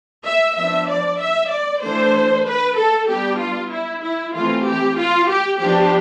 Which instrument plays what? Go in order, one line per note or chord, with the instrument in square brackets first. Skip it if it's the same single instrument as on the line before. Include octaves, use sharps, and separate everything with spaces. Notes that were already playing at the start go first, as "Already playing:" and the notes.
[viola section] E5
F3 B3 D4 E5
D5
E5
D5
E3 A3 D4 C5
B4
A4
G3 B3 D4 G4
F4
E4
E4
E3 A3 C4 F4
G4
F4
G4
F3 B3 D4 G4